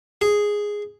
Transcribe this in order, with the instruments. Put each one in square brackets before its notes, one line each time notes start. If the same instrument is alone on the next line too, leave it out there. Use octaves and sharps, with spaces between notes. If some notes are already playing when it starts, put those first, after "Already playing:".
[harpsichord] G#4